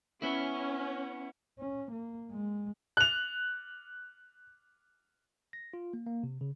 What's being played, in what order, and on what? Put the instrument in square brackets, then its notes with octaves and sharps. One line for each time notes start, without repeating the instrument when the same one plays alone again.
[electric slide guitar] B3 E4 [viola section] C#4
[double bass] C#4
A#3
G#3
[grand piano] F#6 F7
[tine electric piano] A#6
F4
A#3
A#3
C3
C#3